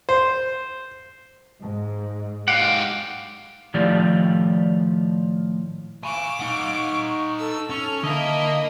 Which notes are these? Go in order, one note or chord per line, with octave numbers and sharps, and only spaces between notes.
C5
G#2
G#2 G4 F5 F#5
A2 D#3 F3 F4 G4 D5
F5 G#5 B5 C#6 D6
D#4 F#5
A4 E6
C#4 F7
D3 A#3 E4 D#5 A5